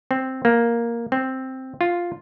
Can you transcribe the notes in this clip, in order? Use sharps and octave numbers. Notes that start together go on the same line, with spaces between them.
C4
A#3
C4
F4